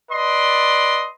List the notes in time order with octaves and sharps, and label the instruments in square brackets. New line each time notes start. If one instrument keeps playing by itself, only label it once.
[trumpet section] B4 D5 D#5 C6